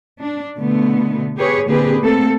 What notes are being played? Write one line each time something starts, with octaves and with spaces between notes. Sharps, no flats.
D4
B2 D3 A3 B3
G4 G#4 B4 C#5
A#2 D3 C4 G4 G#4 B4
A3 A#3 C4 A4